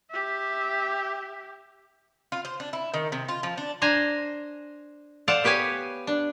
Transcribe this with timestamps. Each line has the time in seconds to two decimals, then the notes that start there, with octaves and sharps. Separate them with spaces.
0.11 G4 E5
2.32 F4
2.45 C5
2.60 D4
2.73 E4
2.94 D#3
3.12 C3
3.28 F4
3.43 F3
3.58 D4
3.82 D4 C5 G#5 A#5
5.28 A4 C5 D5 F5 F#5
5.44 B3 G4 B4 C#5 G#5
6.07 D4